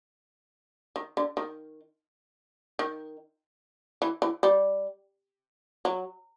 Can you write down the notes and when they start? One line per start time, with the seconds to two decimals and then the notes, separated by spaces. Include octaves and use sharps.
0.96 D#3
1.17 D3
1.37 D#3
2.79 D#3
4.02 E3
4.22 E3
4.43 G3
5.85 F#3